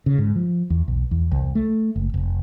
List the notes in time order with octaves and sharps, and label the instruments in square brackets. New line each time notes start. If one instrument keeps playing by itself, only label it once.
[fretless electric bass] C#3
G#2
F3
E2
B1
E2
C2
A3
F#1
F1